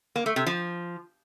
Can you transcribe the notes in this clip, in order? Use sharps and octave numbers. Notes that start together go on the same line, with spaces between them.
A#3
A3
C3
F3